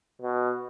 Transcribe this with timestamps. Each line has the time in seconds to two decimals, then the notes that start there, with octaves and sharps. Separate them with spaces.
0.22 B2